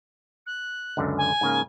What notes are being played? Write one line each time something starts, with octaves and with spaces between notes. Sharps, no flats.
F#6
C#2 F#2 D3
G#5
G#2 C#3 A#3